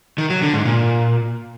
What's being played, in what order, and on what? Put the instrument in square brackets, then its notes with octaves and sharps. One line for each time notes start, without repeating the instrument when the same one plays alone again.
[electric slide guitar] D#3
F#3
D3
G#2
A#2